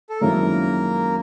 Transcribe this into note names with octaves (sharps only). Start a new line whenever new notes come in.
A4
F#2 D#3 G#3 A#3 C4 E4 A#4